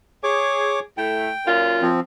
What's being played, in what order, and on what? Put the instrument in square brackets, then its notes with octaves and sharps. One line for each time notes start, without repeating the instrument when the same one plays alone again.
[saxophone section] G#4 [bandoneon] C#5 D6
[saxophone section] A2 A3 [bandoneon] G5
[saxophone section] F#2 A#2 F4
[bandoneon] F3 C4